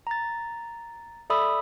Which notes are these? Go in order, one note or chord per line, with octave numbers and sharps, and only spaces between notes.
A#5 A6
A4 D5 E5 B5 D#6 E6